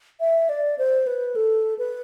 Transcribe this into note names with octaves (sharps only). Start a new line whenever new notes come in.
E5
D5
C5
B4
A4
B4